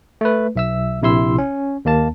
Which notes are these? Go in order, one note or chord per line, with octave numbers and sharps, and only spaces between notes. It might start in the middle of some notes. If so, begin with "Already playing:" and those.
A3 B4
B1 E5 E6
A#1 C3 E4 C6 E6
C#4
D#2 A#3 A5